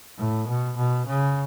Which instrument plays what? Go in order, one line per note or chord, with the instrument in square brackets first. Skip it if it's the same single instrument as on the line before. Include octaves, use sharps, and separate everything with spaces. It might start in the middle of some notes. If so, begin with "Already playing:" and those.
[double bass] A2
B2
B2
C#3